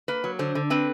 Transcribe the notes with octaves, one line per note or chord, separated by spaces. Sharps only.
A#3 B4
F#3
D3 C5
D3
C4 B4